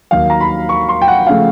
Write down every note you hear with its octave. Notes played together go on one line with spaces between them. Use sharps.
D#2 D#3 F#3 F5
A#5
B5
C#6
C6
G5
F#5
C#3 F3 A3 F5